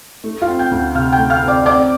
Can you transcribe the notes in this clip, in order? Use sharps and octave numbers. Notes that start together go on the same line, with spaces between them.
A3
F4 F5
C4
G5 G6
D2
C3 F5 F6
G5 G6
A3
F5 F6
C4
D5 D6
C4 D5 D6